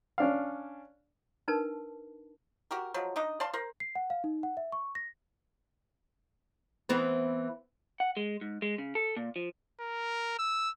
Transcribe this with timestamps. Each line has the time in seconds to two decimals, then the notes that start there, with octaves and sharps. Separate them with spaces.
0.18 C#4 D4 F5
1.48 D4 D#4 A#4 B4 A5
2.71 F#4 G4 A#4
2.94 F3 F#3 G#3
3.16 D4 D#4 D#5
3.40 D5 F5 A5 C6
3.53 A#4 C5
3.80 C7
3.95 F#5
4.10 F5
4.24 D#4
4.43 F#5
4.57 E5
4.72 C#6
4.95 A#6
6.89 E3 B3 C4
8.00 F#5
8.17 G#3
8.41 G#2
8.62 G#3
8.78 C#3
8.95 A4
9.17 A#2
9.36 F3
9.80 A#4
10.39 E6